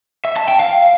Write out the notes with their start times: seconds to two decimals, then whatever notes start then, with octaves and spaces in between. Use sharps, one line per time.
0.25 E5
0.37 A5
0.48 G5
0.60 F5